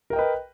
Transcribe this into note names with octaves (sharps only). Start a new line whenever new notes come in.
A#4 B4 D#5 G5